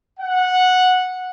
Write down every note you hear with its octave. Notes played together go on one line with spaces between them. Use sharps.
F#5